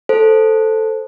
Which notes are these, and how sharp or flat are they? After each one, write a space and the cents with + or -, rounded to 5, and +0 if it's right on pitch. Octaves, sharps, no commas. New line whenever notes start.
A4 +0 C5 +0